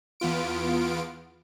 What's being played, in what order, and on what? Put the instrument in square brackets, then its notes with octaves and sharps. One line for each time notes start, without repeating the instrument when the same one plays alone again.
[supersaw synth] E2 B3 F4 D7